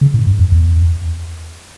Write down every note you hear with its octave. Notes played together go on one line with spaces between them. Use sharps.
C#3
A2
G2
F2
E2